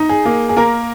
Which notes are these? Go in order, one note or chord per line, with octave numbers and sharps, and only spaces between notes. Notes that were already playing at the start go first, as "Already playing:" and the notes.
Already playing: D#4
G#4
A#3
G#4
A#3 A#4